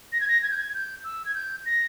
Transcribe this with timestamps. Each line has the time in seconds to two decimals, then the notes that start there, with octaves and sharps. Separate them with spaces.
0.13 A#6
0.21 G#6
0.28 A#6
0.43 G#6
0.51 G6
0.58 G#6
0.74 G6
1.04 E6
1.26 G#6
1.35 G6
1.66 A#6